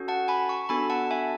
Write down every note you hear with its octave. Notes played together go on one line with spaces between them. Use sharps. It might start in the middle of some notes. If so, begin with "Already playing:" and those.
Already playing: C#4 F#4 A4
F#5 A5
G#5 B5
A5 C#6
B3 D4 F#4 A4 G#5 B5
F#5 A5
E5 G#5